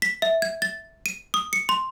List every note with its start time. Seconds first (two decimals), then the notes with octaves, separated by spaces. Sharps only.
0.02 B6
0.22 E5
0.42 G#6
0.62 A6
1.06 D#7
1.34 D#6
1.53 C#7
1.69 C6